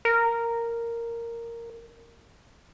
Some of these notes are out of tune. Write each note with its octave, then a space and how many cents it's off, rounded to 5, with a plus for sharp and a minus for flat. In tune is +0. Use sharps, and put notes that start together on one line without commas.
A#4 -5